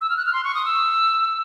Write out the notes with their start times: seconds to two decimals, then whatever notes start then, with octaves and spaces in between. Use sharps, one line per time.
0.01 E6
0.10 F6
0.17 F#6
0.26 F6
0.33 C6
0.44 C#6
0.55 D#6
0.65 E6